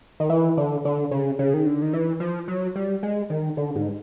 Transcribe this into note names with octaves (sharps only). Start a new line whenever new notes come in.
D#3
E3
D3
D3
C#3
C#3
D#3
D3
D#3
E3
F3
F#3
G3
G#3
D#3
D3
G#2